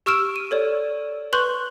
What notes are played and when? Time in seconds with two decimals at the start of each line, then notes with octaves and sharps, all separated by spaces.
0.06 G4 C#6 E6 F6 D7 E7
0.36 D#7
0.51 A4 C#5 D5
1.33 B4 C6 C#6 F#6 G6 F#7